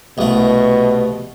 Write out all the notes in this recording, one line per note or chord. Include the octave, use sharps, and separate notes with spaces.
C2 B2 A3